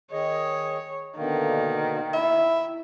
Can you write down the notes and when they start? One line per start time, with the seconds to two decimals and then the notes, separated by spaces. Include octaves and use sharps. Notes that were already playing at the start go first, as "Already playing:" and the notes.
0.12 D#3 G#4 C#5 D#5
1.18 B2 D3 D#3 A#3
2.14 E4 E5